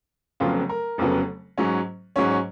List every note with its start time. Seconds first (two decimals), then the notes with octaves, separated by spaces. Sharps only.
0.40 F1 F2 C#3 F#3 B3 F4
0.69 A#4
0.98 F1 F2 C#3 F#3 B3
1.58 G#2 F#3 C#4
2.16 G#2 F#3 C#4 C#5
2.30 C#5